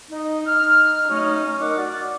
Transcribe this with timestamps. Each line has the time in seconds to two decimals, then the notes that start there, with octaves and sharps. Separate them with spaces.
0.10 D#4
0.45 D#4 F6
1.08 F#3 A3 C#4 D#4
1.60 D#4 A#4 F#5 D6
1.78 F#4 D5